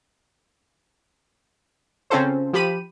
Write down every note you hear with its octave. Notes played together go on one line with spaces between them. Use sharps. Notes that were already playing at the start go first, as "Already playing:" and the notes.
C#3 C4 C#4 F4 A4 C5
F3 G4 B5 D#7